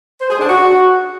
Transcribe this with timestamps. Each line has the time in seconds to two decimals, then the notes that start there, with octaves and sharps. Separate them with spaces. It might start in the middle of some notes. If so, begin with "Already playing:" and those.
0.21 C5
0.30 G#4
0.40 D4
0.49 F#4